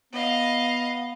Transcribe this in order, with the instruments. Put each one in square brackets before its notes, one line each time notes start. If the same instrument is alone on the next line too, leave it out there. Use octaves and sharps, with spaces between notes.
[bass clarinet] B3 [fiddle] D#5 F5